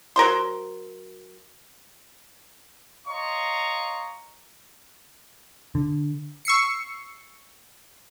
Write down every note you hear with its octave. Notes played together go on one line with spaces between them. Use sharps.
F#3 A#4 C5 C6
C#5 D#5 F5 A#5 C6 C#6
D3
C#6 E6 C7 C#7